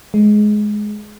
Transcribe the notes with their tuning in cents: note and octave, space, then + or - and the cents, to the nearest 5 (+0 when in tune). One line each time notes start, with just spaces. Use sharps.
G#3 +15